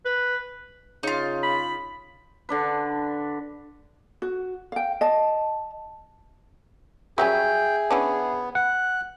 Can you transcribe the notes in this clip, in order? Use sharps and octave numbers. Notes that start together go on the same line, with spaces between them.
B4
C#3 D#4 F4
B5
D3 D4 B4
F#4
F5 G5
D#5 A5
F#3 G3 C#4 G#4 E5 G5 G#5
E3 B3 C#4 D4
F#5 F#6